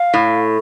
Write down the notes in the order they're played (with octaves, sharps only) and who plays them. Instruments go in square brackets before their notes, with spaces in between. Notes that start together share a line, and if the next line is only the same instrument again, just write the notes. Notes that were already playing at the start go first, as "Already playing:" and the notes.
Already playing: [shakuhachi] F5
[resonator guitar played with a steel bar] A2